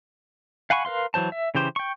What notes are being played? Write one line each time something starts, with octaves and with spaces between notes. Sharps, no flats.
F5 F#5 G#5 B5 C#6
A#4 B4 F5 C6
E3 F#3 C5 A5
E5
C#3 E3 G4 C5
G5 C#6